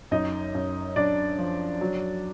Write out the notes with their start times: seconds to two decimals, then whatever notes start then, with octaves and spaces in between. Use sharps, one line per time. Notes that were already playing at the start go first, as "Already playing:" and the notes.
0.11 F#2 D#4 D#5
0.55 F#2
0.96 F#2 D4 D5
1.38 F3
1.81 F#3